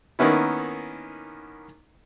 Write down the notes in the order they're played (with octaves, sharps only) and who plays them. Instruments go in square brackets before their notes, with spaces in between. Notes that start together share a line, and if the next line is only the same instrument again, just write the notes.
[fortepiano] D#3 A#3 B3 C#4 E4